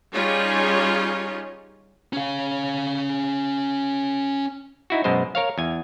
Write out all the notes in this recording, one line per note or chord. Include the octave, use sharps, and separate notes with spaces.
G3 C#4 D#4 F4 G#4 C#5
C#4 F5
D#4 E4 F#4
F#2 B2 G#3 C5
A#4 C#5 F5
E2 G#5